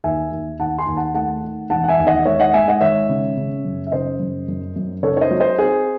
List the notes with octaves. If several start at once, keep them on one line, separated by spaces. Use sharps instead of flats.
D#2 E5 G#5
D#2
D#2 F#5 A5
G#5 C6
D#2
F#5 A5
A3 F#5 A5
D#3
E1 F#5 A5
F#5
E5 G#5
D#2
D#5 F#5
G#3 C#5 E5
D#5 F#5
G#3 E5 G#5
D#5 F#5
G#1 C#5 E5
C#3
C#3
F#2
E5
C#3 C5 D#5
F#2
F#2
F#2
C#3 A4 C#5
C#5
C5 D#5
F#3
C5 D#5
C4 G#4 C5